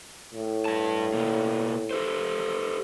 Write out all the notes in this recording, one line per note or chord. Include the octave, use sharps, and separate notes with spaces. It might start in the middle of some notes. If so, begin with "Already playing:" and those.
A2
G2 A5
B2 A#3
G4 A4 C5